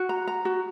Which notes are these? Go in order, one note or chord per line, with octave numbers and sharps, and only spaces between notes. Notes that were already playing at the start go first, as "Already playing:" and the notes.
Already playing: F#4
A#5
A#5
F#4